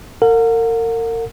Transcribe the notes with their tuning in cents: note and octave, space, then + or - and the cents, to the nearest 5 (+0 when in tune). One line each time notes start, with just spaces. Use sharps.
A#4 -35 F#5 -40